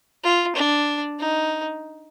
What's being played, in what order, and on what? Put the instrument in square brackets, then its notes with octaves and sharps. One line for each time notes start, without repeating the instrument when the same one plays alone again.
[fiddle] F4
D4
D#4